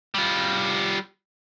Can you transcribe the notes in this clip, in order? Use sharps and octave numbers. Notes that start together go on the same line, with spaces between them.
G3 F4